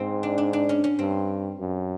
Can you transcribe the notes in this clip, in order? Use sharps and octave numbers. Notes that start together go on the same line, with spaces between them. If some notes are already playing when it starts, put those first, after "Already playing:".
Already playing: G#2 C4
D4
D4
D4
C#4
C#4
G2 C4
F#2